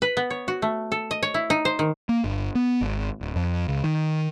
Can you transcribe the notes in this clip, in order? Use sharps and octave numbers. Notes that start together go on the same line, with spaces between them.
B4
B3
C#5
F#4
A3
A4
D#5
C#5
E4
D#4
C5
D#3
A#3
G1
B3
G#1
D1
F2
C#2
D#3